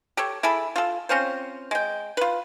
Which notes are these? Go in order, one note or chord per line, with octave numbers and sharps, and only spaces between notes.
G4 A4 C#5
E4 G#4 A4 B5
F4 A4
C4 C#4 F4 C5
G#3 G5
F4 B4